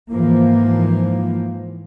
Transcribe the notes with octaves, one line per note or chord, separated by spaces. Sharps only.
G#2 E3 F3 A#3